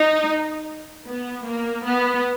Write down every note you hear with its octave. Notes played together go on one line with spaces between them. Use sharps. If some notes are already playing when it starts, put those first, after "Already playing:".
Already playing: D#4
B3
A#3
B3